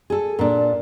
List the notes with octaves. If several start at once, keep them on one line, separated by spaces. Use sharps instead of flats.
G#4 A4
A#2 D4